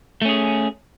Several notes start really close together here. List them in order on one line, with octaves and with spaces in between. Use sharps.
A3 C#4 G#4